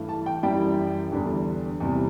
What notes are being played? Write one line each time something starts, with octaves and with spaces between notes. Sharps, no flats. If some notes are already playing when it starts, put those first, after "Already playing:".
Already playing: G2 E3 A3
A5
G5
F#2 E3 G3 G5
E2 D3 G3
E2 C3 G3